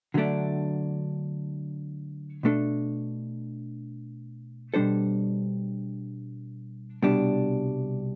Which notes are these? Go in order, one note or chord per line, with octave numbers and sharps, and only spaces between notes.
D3 F#3 A3 D4
B2 A3 D4 A4
B2 G3 D4 A4 C5
C2 B2 G3 D4